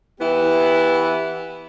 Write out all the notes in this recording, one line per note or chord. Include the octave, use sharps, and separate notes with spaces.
E3 B3 E4 G4